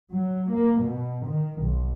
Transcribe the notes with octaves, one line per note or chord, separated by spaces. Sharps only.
F#3
A#3
B2
D#3
B1